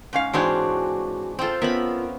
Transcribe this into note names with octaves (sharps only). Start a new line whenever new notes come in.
G#2 C#4 F5
G#2 E3 G#3 C4 D4 F#4 C#5 F5
C4 F4 A4 G5
B3 C#4 F4 A#4 E5 B5